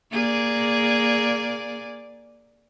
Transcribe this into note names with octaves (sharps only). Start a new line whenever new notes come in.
A#3 G#4 D5